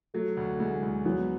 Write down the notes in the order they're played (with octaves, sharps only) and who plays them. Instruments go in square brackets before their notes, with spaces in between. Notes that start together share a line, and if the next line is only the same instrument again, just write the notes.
[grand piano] F#3 [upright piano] A3
[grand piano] D2
[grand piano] D2 [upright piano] G#3
[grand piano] D2
[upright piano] F#3 [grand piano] B3